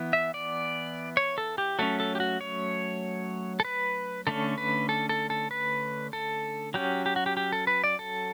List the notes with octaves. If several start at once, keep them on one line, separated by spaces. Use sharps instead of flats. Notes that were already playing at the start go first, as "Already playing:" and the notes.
Already playing: E3 B3
E5
D5
C#5
A4
G4
F#3 A3 C#4 A4
A4
G4
F#4
C#5
A4
B4
D3 A3 C#4 A4
B4
A4
A4
A4
B4
A4
F#3 C#4 G4
G4
F#4
G4
G4
A4
B4
D5
A4